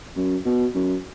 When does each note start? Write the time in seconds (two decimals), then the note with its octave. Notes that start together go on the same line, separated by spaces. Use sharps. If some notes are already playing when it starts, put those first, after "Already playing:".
0.16 F#2
0.45 B2
0.75 F#2